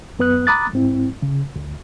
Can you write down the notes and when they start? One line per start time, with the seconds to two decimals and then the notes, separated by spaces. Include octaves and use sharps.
0.19 F#2 B3 B4 D#6 F#6
0.47 A#5 B5 D6 D#6 F#6 A6
0.73 G#2 C4 E4
1.22 C#3
1.56 D2